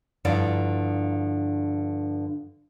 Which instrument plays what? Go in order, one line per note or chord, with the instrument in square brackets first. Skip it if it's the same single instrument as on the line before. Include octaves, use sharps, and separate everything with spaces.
[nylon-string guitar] G2 D3 F3 E4 D5